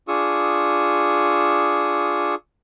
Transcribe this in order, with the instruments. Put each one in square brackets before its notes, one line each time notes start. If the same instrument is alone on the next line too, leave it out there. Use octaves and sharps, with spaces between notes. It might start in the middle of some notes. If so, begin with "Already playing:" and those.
[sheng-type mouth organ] D4 F4 G#4 C#6 D#6 E6